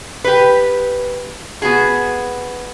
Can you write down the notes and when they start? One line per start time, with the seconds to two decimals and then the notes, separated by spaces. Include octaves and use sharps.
0.24 G4 B4
1.62 B3 F#4 G#4